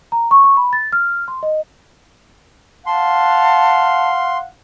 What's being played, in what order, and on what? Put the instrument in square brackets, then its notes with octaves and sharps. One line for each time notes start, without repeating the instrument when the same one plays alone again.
[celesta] A#5
C#6
C#6
B5
A6
F6
C6
D#5
[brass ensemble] F5 F#5 [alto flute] A5 [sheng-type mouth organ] C6